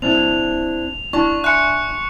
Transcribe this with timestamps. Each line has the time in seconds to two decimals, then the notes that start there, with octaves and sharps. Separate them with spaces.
0.02 C4 D4 E4 F7
1.13 D4 E4 F4 D5 A5 C#6
1.44 E5 G#5 C6 F#6 C#7